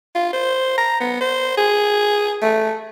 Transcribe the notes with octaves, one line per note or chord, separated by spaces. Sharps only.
F4
C5
A#5
B3
C5
G#4
A3